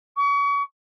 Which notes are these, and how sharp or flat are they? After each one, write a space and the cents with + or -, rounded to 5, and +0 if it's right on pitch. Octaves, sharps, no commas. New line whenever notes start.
C#6 +35